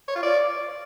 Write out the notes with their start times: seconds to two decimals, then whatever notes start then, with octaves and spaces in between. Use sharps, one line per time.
0.08 C#5
0.15 F4
0.23 D5